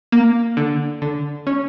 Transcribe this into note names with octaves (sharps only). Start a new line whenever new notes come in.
A#3
D3
D3
C#4